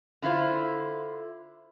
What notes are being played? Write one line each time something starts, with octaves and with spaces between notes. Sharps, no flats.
D3 E4 F4 C5